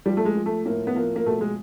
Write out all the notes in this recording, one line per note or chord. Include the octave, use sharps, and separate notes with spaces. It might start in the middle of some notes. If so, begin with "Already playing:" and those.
F3 G3
A3
G#3
F3
A3
A2 A#3
B3
F3 A#3
A#3
B2 A3
G#3